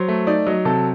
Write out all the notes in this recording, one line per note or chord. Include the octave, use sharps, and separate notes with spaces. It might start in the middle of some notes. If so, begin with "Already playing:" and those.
Already playing: F#3 C5
A3
D#4 D5
F#3 D#5
C3 A4